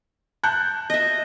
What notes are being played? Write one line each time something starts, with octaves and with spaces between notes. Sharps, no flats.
A5 F#6 G6
D#5 E5